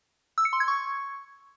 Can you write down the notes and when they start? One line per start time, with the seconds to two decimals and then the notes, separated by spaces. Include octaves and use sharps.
0.38 E6
0.45 C#7
0.53 C6
0.60 G#6
0.68 C#6